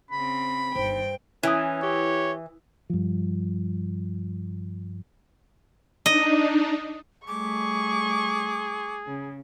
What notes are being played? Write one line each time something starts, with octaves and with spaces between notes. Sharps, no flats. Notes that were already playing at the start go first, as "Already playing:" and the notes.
C#3 C4 B5
G1 G2 D#3 C5 G5
E3 C#4 E4 G#5 D#6
G4 C#5
G2 F3
D4 D#4 D#5
G3 A3 G#4 C#6 D6
C#3